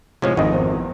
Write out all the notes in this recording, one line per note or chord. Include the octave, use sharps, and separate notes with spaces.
A1 C3 F3 G#3 C#5
G#1 F2 D#4 D#5
E2 C4